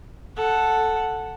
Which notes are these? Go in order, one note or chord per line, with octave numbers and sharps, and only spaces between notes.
A4 F#5